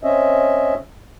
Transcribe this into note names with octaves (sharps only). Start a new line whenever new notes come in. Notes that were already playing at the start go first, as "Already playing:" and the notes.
C4 C#4 D#5 E5